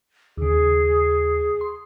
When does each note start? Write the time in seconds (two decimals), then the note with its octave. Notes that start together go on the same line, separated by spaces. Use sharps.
0.37 D#2 C#3 G#4
1.61 C6